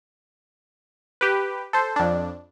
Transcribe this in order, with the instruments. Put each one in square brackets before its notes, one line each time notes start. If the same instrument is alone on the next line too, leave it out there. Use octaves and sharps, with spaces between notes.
[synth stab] G4 B4
A4 C5
F2 D4